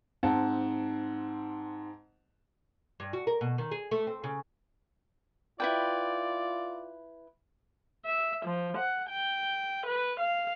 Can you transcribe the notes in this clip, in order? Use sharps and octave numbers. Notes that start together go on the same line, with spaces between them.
G#2 C4 F#5 A5
G2
F#4
A#4
B2
D#3
G#4
A3
C4
C#3
E4 F4 B4 D5 G5
E5
F3
F#5
G5
B4
F5